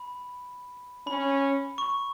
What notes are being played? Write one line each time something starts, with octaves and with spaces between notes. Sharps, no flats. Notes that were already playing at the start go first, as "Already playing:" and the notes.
Already playing: B5
C#4 B5
C#6